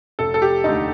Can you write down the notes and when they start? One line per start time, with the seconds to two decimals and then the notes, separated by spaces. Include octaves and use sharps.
0.19 F1 A4
0.34 A4
0.42 G4
0.64 D#2 D3 A3 D#4